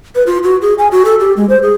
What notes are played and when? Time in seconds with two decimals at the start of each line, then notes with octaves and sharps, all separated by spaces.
0.15 B4
0.27 F4
0.44 F#4
0.62 G#4
0.78 G#5
0.92 F#4
1.05 A4
1.20 G4
1.37 G#3
1.49 C5
1.63 G#4